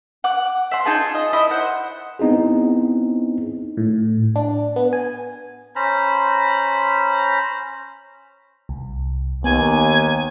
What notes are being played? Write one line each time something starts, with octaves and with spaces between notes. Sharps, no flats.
F#5 D6
E5 F#5 C6
D#4 F4 G#4 A5
D#5
E4 D#5 E5
C5 F#5
B3 C4 D#4 E4 G#4
A2
D4
B3
G#5
C#4 C5 A#5 B5
C2
D#2 B3 G#5